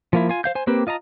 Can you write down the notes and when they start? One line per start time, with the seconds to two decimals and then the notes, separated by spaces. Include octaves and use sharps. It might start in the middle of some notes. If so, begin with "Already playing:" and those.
0.13 F3 A#3 E4
0.29 F4 G#5
0.44 C5 F5 G6
0.55 C5 G#5
0.67 A#3 C4 G4 B4
0.87 F4 D#5 A5 A#5